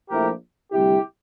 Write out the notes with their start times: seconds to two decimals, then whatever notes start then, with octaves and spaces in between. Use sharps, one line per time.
0.09 A#1 A#2 F3 A3 E4 G4 A#4
0.72 D2 C3 G3 E4 G4